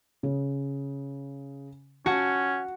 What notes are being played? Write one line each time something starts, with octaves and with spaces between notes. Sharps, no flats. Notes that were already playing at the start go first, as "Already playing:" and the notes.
C#3
C#4 F#4 A5